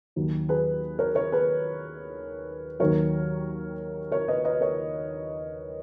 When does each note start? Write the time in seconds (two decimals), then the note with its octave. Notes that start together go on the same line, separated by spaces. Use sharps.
0.16 D#2 D#3 F#3
0.49 G#4 B4
0.99 A#4 C#5
1.15 A#4 C#5
1.32 G#4 B4
2.80 D#2 D#3 F#3 A#4 C#5
4.11 A#4 C#5
4.28 B4 D#5
4.44 B4 D#5
4.61 A#4 C#5